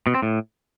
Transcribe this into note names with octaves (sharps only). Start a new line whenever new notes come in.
B2
C4
A2